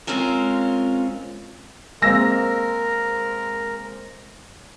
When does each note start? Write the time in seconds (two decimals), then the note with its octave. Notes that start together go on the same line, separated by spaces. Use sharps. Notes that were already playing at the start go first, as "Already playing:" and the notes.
0.07 G#3 C4 C#4 F4 A#4
2.02 G#3 A#3 C4 A#4 E6 A#6